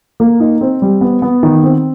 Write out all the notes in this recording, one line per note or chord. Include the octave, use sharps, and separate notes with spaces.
A#3
D#4
C4
G3
B3
B3
D#3
C4